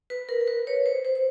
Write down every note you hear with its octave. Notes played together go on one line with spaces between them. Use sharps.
B4
A#4
A#4
B4
C#5
C5
C5
C5